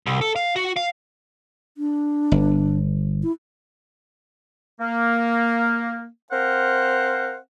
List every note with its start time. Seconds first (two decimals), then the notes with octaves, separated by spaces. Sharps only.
0.06 C2
0.21 A4
0.36 F5
0.56 F#4
0.76 F5
1.78 D4
2.32 G1
3.23 E4
4.80 A#3
6.32 C4 A#4 C5 F5 F#5